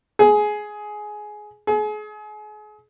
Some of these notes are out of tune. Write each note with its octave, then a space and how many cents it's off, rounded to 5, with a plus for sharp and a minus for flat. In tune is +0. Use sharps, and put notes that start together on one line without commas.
G#4 +15
G#4 +35